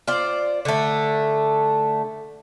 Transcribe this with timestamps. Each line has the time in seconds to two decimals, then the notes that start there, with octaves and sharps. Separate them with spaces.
0.07 F4 C5 D5
0.65 D3 A3